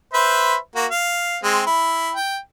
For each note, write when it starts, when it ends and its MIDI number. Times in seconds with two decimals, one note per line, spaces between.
0.14 0.56 71
0.14 0.56 72
0.14 0.56 76
0.76 0.86 58
0.76 0.86 66
0.91 1.38 77
1.44 1.61 56
1.44 1.61 60
1.67 2.12 64
2.15 2.38 79